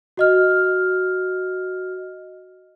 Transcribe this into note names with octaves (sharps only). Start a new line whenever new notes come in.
F#4 D#5 F6